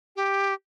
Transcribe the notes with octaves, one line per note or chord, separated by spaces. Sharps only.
G4